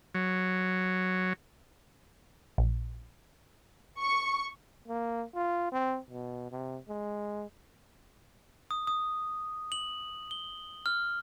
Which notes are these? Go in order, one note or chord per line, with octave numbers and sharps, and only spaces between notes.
F#3
A#1
C#6
A#3
F4
C4
B2
C3
G#3
D#6
D#6
F#7
G7
F6